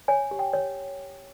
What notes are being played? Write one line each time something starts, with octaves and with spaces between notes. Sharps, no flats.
C#5 G#5
G4
G5
C#5